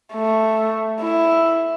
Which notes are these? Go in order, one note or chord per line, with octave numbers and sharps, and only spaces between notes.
A3
E4